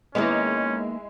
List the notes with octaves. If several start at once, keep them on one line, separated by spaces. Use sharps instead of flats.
D#3 G#3 A#3 B3 C#4 E4